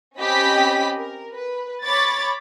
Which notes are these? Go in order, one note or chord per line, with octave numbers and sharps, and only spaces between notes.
C4 C#4 G4 D#5 B5 B6
A#4
B4
C#5 B5 D6 A6